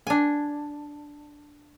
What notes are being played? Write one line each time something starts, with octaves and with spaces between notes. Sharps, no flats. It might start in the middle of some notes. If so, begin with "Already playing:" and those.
D4 G#5